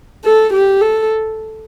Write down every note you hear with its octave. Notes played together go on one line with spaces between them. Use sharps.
A4
G4
A4